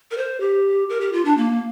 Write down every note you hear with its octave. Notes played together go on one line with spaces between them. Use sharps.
A#4
C5
G4
A#4
G4
F4
D4
A#3